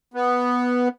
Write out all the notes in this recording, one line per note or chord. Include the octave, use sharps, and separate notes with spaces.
B3